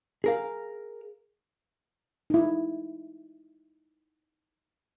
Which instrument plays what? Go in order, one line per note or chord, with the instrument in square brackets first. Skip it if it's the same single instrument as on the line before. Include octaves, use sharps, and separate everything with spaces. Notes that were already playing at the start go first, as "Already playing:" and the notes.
[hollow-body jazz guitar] G#4 A#4 F5
[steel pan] D#4 E4